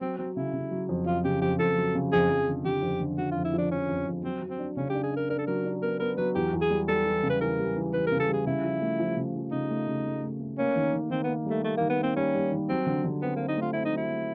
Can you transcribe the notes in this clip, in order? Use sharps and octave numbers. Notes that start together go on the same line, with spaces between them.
F#3 C4
F#3 C4
C#3 E4
C#3
F#3
F2
F2 F4
C#3 G4
F2 G4
F2 A4
F#3
C#3
F2 G#4
F2
D3
D3 G4
F2
D3
D3 F#4
F4
F2
E4
F3 D4
F3 C#4
F2
F2
F#3 C4
F#3
C4
D4
C#3 C#4
G4
D4
G#4
D4
A#4
D4 A#4
A4
F#3 A#4
D4
B3 A#4
B3 A#4
F#3 B4
E2 G4
E2
G#4
G3
G3 A4
E3
C#3
B4
E3 A#4
G3
E3
E3 B4
A#4
C#3
A4
G3 G#4
C#3 E4
F3
A3
F3
C#3
F3
C#3 D#4
A3
C#3
A3
A3
A3
A#3 C#4
D#3
D#3
D#3 C4
B3
A#3
G3 A3
G3 A3
D#3 A#3
B3
A#3 C4
G3 C#4
G3
D#3
F#3 C4
D3
D3
B3 C4
A#3 C4
D#4
A3 F4
C4 E4
D#4
F#3
E4
A3